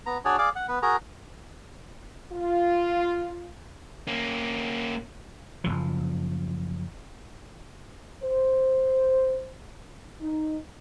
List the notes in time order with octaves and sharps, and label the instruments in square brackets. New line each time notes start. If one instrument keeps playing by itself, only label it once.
[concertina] B3 A#5
D4 F#4 G#4 C#5 D5
G#4 D5 F5 D6
F#5
B3 B4
F#4 G#4 A#4 A#5
[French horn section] F4
[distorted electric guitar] A#3 C#4
[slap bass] F#1 B1 F3
[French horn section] C5
D#4